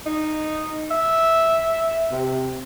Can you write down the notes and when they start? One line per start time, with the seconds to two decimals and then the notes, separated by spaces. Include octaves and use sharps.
0.06 D#4
0.91 E5
2.11 C3